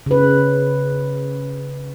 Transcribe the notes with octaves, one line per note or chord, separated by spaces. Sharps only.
C#3 B4